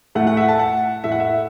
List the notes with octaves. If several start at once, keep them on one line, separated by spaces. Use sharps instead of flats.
A2 A3 E4 F#5
F#5
E5
A5
F#5
A2 A3 E4 E5
F#5
E5